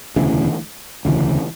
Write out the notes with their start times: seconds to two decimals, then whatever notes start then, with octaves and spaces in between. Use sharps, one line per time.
0.16 E1 D2 C#3 E3
1.05 E1 D2 C#3 E3